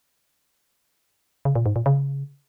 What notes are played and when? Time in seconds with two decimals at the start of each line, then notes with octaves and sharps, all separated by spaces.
1.45 C#3
1.55 A#2
1.66 G#2
1.76 A#2
1.86 C#3